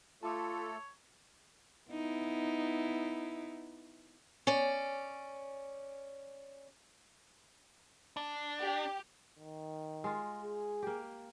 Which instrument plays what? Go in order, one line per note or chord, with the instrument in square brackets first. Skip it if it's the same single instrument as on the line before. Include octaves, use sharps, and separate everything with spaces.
[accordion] A3 A4 [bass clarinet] F4 [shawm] C#5 [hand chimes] A5 D6 E6
[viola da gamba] B3 D#4 E4
[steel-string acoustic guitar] C#4 D5
[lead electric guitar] D4
[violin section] G4
[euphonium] D#3
[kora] G#3 F4
[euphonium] G#4
[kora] A#3 G4